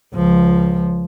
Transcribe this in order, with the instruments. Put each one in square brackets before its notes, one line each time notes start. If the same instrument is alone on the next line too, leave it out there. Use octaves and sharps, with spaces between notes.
[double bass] C#2 F3